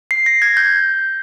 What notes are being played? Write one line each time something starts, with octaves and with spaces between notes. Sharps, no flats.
C7
A#6
G#6
G6